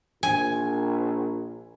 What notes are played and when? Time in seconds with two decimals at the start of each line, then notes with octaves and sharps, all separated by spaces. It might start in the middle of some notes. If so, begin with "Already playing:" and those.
0.23 A#1 G#5